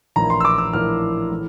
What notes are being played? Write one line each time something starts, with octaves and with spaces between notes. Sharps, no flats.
A#1 A2 E3 A#3 E4 A#5
C6
E6
D6
E6
A#1 A2 E3 A#3 E4 F6
A2 E3 A3